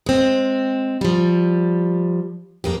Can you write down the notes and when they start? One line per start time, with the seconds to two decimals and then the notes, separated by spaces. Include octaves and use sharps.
0.06 G#3 C4
1.01 F3 G3
2.64 F2 A#3 G4